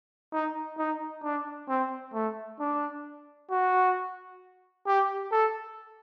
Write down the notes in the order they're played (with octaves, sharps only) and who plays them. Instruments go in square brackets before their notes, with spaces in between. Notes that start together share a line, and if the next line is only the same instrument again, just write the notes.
[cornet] D#4
D#4
D4
C4
A3
D4
F#4
G4
A4